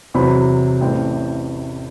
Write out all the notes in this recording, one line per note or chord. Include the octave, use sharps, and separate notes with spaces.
E2 C3 F#3 C4 B5
A1 A2 G3 C4 E4 G5